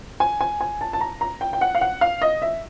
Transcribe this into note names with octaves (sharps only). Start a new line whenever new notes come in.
G#5
G#5
G#5
A5
A5
A#5
A#5
G5
G5
F#5
F5
F#5
F5
D#5
E5